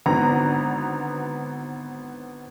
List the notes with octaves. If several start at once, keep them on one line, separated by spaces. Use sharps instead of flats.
G#1 D3 B3 A#5